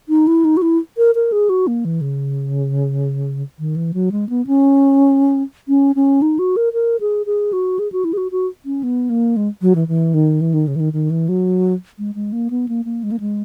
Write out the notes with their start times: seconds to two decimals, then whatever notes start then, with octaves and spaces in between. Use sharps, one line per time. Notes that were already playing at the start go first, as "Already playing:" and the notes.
0.09 D#4
0.27 E4
0.45 D#4
0.57 F#4
0.62 E4
0.97 A#4
1.15 A#4
1.32 G#4
1.49 F#4
1.67 A#3
1.85 E3
2.01 C#3
3.59 D#3
3.76 E3
3.94 F#3
4.12 G#3
4.29 B3
4.47 C#4
5.69 C#4
5.96 C#4
6.22 D#4
6.39 F#4
6.57 A#4
6.73 A#4
7.01 G#4
7.26 G#4
7.53 F#4
7.79 G#4
7.92 F#4
8.05 E4
8.13 G#4
8.17 F#4
8.32 F#4
8.65 C#4
8.83 B3
9.10 A#3
9.36 G#3
9.61 F#3
9.75 E3
9.88 E3
10.14 D#3
10.41 E3
10.54 D#3
10.67 C#3
10.76 E3
10.80 D#3
10.93 D#3
11.10 E3
11.29 F#3
11.99 G#3
12.15 G#3
12.32 A#3
12.50 B3
12.69 A#3
12.85 A#3
13.03 G#3
13.12 A#3
13.20 G#3